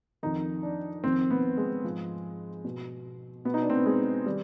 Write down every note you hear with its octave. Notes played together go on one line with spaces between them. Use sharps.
F2 D#3 D#4
D4
F2 D#3 C4
B3
G#3
G#2 F3
B2
B2 B3
D#4
D4
C4
B3
G#3
D#3 G3